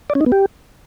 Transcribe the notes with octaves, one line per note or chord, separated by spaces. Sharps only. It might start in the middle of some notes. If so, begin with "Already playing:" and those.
D5
C#4
D#4
B3
G4